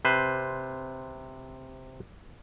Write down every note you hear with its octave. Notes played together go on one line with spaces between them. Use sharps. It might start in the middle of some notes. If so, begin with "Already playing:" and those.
C3 B4 C5